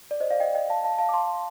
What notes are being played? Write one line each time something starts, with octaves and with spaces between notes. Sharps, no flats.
D5
C5 D#5
D5 F5
D#5 G5
D#5 G5
F5 A5
F5 A5
F5 A5
D6
A5 C6